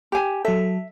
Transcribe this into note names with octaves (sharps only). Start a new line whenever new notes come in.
G4 G#5
F#3 A4 E5